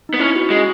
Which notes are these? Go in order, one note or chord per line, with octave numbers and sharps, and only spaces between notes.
B3 D#4
C#4 E4
F#4
G#3 F#4